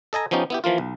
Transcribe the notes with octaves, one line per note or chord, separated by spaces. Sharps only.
A4 D#5 G#5 A#5
F3 B3 C#4 D#4 G4
B3 E4 G4
E3 F3 A#3 F4
B1